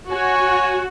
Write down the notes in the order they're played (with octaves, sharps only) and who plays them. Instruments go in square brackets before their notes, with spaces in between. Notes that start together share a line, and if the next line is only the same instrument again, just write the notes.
[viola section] F#4 [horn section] C#5 G#5